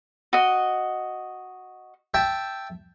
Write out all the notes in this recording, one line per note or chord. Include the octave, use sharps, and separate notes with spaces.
F#4 D#5
E5 G5 A5